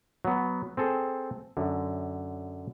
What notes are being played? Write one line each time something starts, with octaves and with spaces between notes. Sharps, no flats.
F#3 B3
C4 G#4 A4
F#2 D3